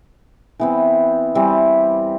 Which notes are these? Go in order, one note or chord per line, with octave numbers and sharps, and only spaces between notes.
E3 B3 C4
E3 G3 C4